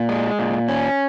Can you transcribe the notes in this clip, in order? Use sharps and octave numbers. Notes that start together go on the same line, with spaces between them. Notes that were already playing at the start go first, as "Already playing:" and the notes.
Already playing: A#2
G#3
A#2
C#4